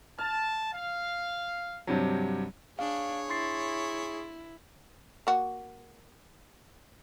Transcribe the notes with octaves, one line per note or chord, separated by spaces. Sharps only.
A5 F6
F5
G2 C3 F#3
D4 G#4 C#5 F5
E4 C6 A6 C7
A#3 F#4